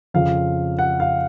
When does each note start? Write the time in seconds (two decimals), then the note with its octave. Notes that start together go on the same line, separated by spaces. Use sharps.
0.14 F2 C#3 F3 F5
0.79 F#5
1.00 F5